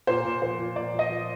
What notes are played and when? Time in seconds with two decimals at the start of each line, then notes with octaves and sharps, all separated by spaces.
0.07 A#2 C5
0.25 A#2
0.42 F3 C5
0.59 A#2
0.76 A#2 D5
0.93 F3
0.99 D#5
1.10 F3